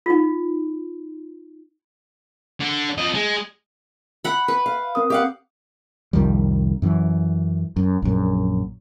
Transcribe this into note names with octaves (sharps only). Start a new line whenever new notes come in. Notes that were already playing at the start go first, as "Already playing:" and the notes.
D#4 F4
D3
F2 D#5
G#3
F#5 B5
B4
F5
C4 A#4 D#6
G4 F5 F#5
C2 F2 D#3 G3
F#2 E3
F#2
A#1 F#2